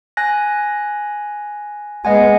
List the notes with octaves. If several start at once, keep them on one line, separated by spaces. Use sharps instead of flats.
G#5 F#6 A#6
G#3 B3 D#5 F#5 G#5